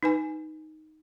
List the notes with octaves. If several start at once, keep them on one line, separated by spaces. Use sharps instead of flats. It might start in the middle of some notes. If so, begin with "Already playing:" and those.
D#4 B4 G#5